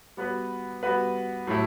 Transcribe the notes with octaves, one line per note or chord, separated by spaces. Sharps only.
G3 B3 F#4 B4
G3 B3 F#4 B4
A2 F#3 A3 E4 G4